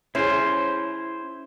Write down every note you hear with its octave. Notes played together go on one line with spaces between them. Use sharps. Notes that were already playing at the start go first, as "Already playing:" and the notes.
C#4 E4 G#4 C5